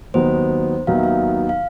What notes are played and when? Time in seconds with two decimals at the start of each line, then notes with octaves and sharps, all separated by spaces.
0.14 D#2 D#3 F#3 B3 D#4 C5
0.87 D#2 D#3 F#3 B3 D#4 F5
0.95 E5
1.03 F5
1.49 F5